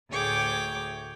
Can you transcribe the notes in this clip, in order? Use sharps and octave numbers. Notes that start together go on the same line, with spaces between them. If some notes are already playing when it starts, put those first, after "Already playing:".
D2 A2 G#4 C#5 G5 D6